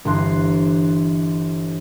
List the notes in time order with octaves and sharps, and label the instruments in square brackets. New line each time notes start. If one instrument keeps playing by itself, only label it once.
[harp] G1 E3 C6 F#6